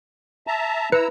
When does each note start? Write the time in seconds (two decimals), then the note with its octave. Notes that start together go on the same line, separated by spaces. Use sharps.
0.47 E5 A5 A#5
0.92 E4 B4 A#5 E6 C#7